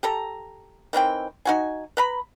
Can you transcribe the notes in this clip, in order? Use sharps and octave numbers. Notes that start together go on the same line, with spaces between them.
G4 A4 A#5
D#3 E3 C4 G5
D#4 F#4 G#5
B4 A#5 B5